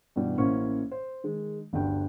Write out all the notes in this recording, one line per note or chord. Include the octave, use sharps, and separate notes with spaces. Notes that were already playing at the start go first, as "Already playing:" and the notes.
G2 B2 E3 G3
A1 A#3 C#4 E4 C5 C#6
C5
D#3 G#3
G1 D2 G2 G5